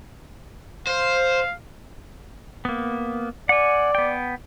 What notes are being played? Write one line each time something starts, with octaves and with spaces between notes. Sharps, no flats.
C5 F5
A#3 B3
D5 F#5 G#5
B3 G5